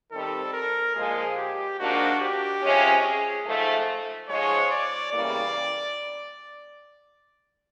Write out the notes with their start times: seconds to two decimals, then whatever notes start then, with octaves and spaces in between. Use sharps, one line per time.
0.12 D#3 G3 C4 A4
0.53 A#4
0.95 A#2 F3 G#3 G#4
1.37 G4
1.79 G#2 F3 A#3 D4 F#4
2.20 G4
2.62 C3 F3 G#3 C#4
3.04 G#4
3.45 G#2 F3 A3
4.28 G#2 F3 G#3 C#5
4.71 D5
5.12 E2 C#3 E3 G3 A#3 D5